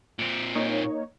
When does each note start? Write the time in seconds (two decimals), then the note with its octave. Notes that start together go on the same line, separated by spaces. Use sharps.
0.18 A#2 C4
0.55 A#3 D#4 C#5